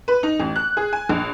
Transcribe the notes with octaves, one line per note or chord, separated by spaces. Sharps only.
B4
D#4
A1
F#6
G#4
G#5
A#1